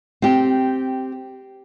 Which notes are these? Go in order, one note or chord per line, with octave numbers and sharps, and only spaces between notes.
C4 G4